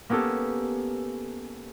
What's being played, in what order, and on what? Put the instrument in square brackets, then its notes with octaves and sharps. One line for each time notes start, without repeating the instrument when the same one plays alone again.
[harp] A#3 B3 C#4 G4 A4